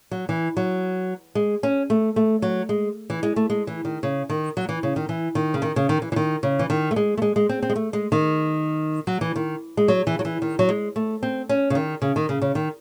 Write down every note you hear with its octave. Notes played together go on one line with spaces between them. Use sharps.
F#3
E3
F#3
G#3
C#4
A3
A3
F#3
G#3
E3
G#3
A3
G#3
E3
D#3
C#3
D#3
F#3
E3
C#3
D#3
E3
D#3
C#3
D#3
C#3
D#3
E3
E3
D#3
C#3
E3
D#3
A3
G#3
A3
G#3
G#3
C4
C4
G#3
A3
G#3
D#3
F#3
E3
D#3
G#3
F#3
E3
F#3
E3
D#3
F#3
G#3
A3
C4
C#4
C#3
D#3
C#3
D#3
C#3
C#3
D#3